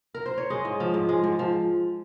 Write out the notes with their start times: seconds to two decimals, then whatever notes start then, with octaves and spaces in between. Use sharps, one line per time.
0.14 A#4
0.26 C5
0.38 C#5
0.50 G#3 D#5
0.65 G#2
0.80 F3
0.94 G#2
1.09 G#3
1.24 G#2
1.39 F3